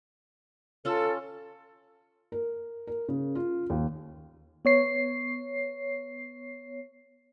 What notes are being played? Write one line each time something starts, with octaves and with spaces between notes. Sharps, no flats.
C#4 F4 A4 A5
A#4
A#4
C#3
F4
D#2
B3 C#5 C7